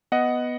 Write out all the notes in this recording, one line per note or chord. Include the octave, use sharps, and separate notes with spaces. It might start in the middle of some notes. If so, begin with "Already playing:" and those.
B3 D#5 F#5